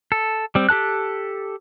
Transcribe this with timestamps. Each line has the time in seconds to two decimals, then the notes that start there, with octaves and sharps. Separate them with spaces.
0.12 A4
0.55 G3 C4
0.69 G4 A4 A5 F#6